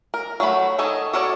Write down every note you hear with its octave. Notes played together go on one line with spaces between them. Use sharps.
A#4
F#3 A3 F#4 G#4 B5
D#3 D#4 A4 C#5 D#5
F#4 A4 A#4 C#5 D5